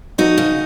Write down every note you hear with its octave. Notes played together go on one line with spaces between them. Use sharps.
F2 D#4 F#4
C#3